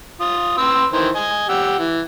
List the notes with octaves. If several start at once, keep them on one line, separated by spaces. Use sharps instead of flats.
F4 D#6
B4 C6 E6
D#3 E3 C5
D#5 G#5
G4 F#5 E6
E3